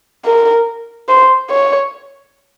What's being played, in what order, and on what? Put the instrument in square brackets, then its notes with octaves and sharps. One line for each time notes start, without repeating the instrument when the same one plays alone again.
[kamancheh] A#4
C5
C#5